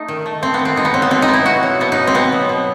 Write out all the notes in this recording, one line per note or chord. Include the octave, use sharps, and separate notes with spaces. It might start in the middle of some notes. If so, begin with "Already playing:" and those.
Already playing: A3 D#4
D#3
A3
A3 C4
B3
D#3
C4
B2 D#4
B3
F#3 C4
B3
B2 C4
D#4
B3
E4
B2 F#4
F#3
B2 B3
D#4
B3
C4
B2 B3
F#3
B2